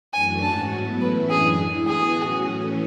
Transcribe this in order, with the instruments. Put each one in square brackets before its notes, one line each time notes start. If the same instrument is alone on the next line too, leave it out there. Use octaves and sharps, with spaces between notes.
[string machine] F#2 E3 A3 D4 F#4 [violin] G#5
[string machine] G#2 G#3 C#4 F#4 [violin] A5
[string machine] A2 F#3 B3 E4
[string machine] A2 E3 A3 C#4 E4 [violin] B4
[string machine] F#2 E3 G#3 D4 [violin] G#4
[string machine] D3 A3 E4
[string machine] E3 B3 F#4 [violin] G#4
[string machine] A2 F#3 C#4 F#4
E3 A3 C#4